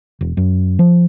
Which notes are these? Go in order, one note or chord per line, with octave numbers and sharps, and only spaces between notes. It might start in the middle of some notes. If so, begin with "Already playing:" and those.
E1
F#2
F3